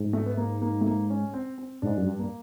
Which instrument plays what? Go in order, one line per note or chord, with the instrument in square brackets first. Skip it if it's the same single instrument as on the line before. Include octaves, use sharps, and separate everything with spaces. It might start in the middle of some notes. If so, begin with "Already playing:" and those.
Already playing: [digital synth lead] G#2
[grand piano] A3
B3
A#3
A#3
A3
A#3
C#4
C4
C4
[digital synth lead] G#2 [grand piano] D4
[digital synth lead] F#2
G2
[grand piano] A#3